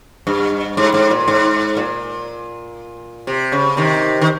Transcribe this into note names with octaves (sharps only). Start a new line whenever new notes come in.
G2
G#2
G#2
A#2
G#2
A#2
C3
C#3
C3 D#3
D#3